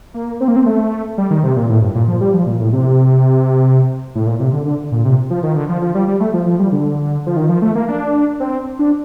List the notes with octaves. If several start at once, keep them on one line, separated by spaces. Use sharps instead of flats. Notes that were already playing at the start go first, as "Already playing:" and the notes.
A#3
C4
A#3
C4
A3
G3
D#3
C3
A#2
A2
G2
A#2
F3
G3
F3
A#2
A2
C3
A2
A#2
C3
D3
D3
A#2
C3
F3
D#3
D3
F3
F3
G3
G3
A3
F3
F3
G3
D3
F3
D#3
F3
A3
A#3
D4
C4
D4